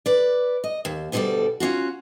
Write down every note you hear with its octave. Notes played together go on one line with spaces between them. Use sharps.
B4 D5
D#5
D#2
D2 B2 G3 E4 A4 D5
C#4 D4 F4 F#4